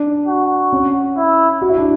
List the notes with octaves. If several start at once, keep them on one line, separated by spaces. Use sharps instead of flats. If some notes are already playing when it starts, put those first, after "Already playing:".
Already playing: D4
F#4
C#4
E4
F#4
E4
D4